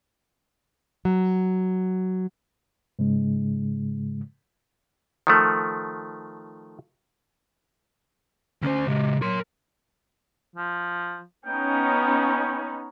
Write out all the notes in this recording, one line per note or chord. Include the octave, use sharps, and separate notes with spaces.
F#3
G#2 C#3 G#3
D#3 F3 A3
D2 C#4 C5
C#3 G#3 G4
F#3 A#4 C6
F3
B3 C#4 D#4 G5